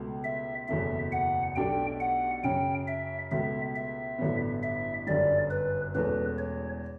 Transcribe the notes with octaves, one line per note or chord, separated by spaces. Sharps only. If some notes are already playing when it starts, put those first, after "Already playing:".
Already playing: C#2 B2 A3
E5
F#1 E2 B2 F#3 A3 E5
F#5
B1 B2 A3 D4 G4 G5
F#5
F#2 C#3 F#3 C#4 G5
E5
C#2 B2 A3 E5
E5
A1 G2 D3 F#3 B3
E5
G1 F#2 D3 G3 D5
B4
E1 E2 B2 A3 C#4 B4
C#5